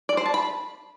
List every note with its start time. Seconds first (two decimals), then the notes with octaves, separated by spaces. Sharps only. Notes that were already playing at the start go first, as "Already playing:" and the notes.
0.09 D5
0.17 C5
0.26 A5
0.34 B5